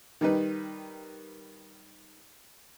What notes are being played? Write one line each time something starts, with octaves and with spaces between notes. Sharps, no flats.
D#3 G3 D#4 B4